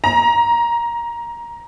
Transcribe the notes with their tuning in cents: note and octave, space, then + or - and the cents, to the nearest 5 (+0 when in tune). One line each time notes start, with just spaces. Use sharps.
A#5 +15